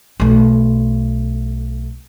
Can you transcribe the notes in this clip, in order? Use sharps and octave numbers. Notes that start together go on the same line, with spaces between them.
B1 A3